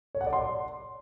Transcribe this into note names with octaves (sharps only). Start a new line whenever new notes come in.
C#5
F#5
D5
C6